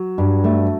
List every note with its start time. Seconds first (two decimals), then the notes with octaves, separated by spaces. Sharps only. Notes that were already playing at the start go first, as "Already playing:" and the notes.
Already playing: F#3
0.18 G2
0.44 A3